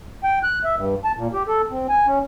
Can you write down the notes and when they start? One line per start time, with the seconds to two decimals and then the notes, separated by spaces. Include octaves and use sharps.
0.24 G5
0.43 F#6
0.64 E5
0.76 G2
1.04 A5
1.17 A#2
1.33 G4
1.47 A4
1.70 C4
1.89 G#5
2.07 C#4